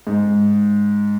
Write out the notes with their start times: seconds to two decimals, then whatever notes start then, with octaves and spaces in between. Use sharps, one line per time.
0.07 G#2